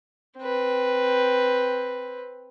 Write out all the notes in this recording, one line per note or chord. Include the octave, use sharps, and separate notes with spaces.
C4 B4